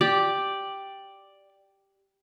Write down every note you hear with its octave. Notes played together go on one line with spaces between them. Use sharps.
G4 D5